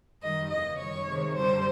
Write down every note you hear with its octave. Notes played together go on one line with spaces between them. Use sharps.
F#2 D#3 G3 D#5
E2 C#3 E3 D#5
F#2 D#3 G3 C#5
C3 D#3 G#3
F#2 D3 G3 C5